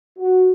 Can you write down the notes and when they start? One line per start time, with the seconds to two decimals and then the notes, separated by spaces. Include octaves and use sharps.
0.17 F#4